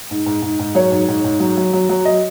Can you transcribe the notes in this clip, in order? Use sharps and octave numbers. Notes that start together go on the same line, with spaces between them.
G#2
G#2
G#2
G#2
F#3 C#5
G#2
G#2
G#2
F#3
F#3
F#3
F#3
D#5